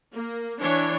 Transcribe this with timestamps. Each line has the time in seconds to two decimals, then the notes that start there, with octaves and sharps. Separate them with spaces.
0.14 A#3
0.60 E3 D4 C#5